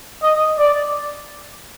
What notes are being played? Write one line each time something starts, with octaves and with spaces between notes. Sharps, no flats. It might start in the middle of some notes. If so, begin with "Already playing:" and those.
D#5
D5